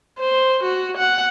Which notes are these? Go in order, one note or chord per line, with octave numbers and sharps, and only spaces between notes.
C5
F#4
F#5